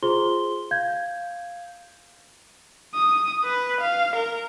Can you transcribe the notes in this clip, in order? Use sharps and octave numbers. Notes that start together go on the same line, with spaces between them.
F4 G#4 C5 C6 G7
F5 G6 G#6
D#6
B4
F5
A#4